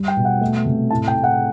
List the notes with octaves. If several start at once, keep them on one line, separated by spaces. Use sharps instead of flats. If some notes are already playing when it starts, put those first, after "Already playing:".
Already playing: G3
G5
B2
F#5
A3
C3
A2 A5
G5
A2
F#5